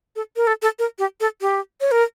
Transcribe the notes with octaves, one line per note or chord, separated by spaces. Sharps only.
A4
A#4
A4
A4
A#4
G4
A4
G4
C#5
A#4